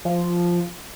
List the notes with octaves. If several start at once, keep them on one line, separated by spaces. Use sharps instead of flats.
F3